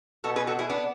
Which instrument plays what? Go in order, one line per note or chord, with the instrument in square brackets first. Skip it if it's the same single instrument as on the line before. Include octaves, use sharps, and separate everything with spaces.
[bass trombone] B2 [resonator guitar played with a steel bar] F#4 A4
[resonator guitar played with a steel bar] G#4 B4
F#4 A4
E4 G#4
B3 D4